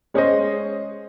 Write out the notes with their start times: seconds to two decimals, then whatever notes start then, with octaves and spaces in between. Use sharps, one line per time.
0.14 G#3 C#4 G#4 C5 D#5